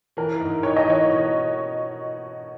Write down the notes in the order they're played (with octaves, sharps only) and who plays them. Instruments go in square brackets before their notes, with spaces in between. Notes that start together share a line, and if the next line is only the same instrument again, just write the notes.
[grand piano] E3 [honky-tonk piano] A#4
[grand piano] G#2
[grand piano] D#4 [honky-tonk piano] C#5
[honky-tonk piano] D#5
[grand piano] E3 [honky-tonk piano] C#5
[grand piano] B2